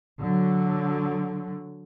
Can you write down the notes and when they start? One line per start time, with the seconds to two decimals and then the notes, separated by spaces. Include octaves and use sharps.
0.19 D3 F#3